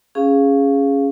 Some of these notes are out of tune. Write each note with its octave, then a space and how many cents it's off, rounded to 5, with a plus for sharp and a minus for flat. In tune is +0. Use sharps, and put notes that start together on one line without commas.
C#4 +0 G#4 +0 F5 +0